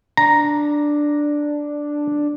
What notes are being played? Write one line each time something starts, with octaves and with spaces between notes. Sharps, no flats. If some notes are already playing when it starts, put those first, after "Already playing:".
D4 A#5